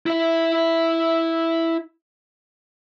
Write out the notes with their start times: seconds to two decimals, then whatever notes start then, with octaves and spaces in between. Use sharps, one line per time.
0.06 E4 E5